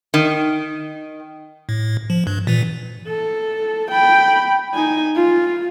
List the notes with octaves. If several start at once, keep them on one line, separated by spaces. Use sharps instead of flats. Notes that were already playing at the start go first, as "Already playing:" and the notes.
D#3
A2
F3
G2
A#2 E3
A4
G5 B5
D#4 G#5
F4